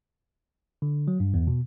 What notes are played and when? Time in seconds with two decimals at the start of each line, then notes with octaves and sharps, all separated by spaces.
0.82 D3
1.08 F#3
1.20 G2
1.34 E2
1.47 B2